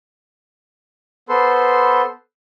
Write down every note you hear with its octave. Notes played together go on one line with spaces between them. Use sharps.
B3 A4 B4 C5 C6